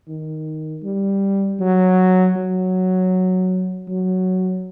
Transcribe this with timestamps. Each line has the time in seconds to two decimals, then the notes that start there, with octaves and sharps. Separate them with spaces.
0.08 D#3
0.84 G3
1.60 F#3
2.36 F#3
3.88 F#3